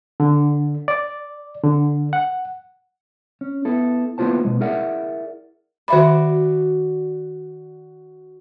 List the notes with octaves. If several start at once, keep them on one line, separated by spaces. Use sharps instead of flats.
D3
D5
D3
F#5
C#4
B3 E4 A4
A#3 B3 E4 F4 C5 A5
B2 G#3
E4 G#4 A#4 D5 E5 F#5
D#3 F#4 D5 E5 B5